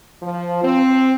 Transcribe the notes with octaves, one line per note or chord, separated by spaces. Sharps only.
F3
C4